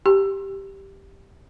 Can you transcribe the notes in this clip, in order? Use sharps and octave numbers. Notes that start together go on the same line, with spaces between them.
G4